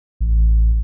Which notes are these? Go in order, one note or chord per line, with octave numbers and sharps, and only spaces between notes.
A1